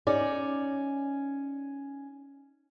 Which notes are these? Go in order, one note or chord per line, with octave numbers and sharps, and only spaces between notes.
C#4 D#4 D5